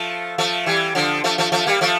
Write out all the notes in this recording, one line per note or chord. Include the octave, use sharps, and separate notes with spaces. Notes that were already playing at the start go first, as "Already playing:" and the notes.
Already playing: F3 A3
F3 A3
E3 G3
D3 F3
F3 A3
F3 A3
F3 A3
G3 A#3
F3 A3